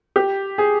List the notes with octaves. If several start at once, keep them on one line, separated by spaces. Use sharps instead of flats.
G4
G#4